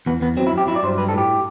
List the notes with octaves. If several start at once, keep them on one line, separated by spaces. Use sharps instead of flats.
E2 B3
E2 B3
F#3 C4
E4
F#2
G4
F#3 E4
D5
G2 C5
G3 B4
A4
A2 G4